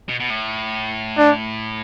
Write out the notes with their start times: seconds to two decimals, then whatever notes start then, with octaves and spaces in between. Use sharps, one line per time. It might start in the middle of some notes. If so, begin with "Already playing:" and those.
0.09 B2
0.20 B2
0.30 A2
1.18 D4